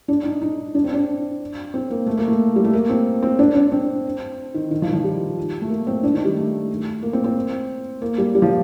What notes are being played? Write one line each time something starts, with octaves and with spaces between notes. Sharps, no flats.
D4
D#4
D#4
D4
C4
D4
C4
A#3
A3
A#3
A3
G3
A3
A#3
C4
C4
D4
D4
C4
D#3
D#3
F3
D#3
F3
G3
A3
A#3
C4
D4
D#3
G3
A3
A#3
C4
C4
A#3
G3
G3
F3